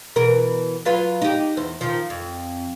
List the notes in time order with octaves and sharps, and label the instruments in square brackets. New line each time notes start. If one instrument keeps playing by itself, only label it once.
[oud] B2 E3 A#4
F#3 F4 B4
D#4 G4
E2 C5
D#3 F3
F2